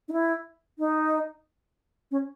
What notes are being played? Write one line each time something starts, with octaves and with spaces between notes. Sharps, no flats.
D#4
E4
D#4
C#4